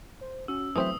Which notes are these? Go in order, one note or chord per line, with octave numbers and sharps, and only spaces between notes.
C5
C#4 F#4 E6
E3 F#3 A3 C4 C5 E5 D#6